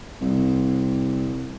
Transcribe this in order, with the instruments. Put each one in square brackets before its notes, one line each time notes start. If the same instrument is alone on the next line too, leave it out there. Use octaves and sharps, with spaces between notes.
[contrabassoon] C2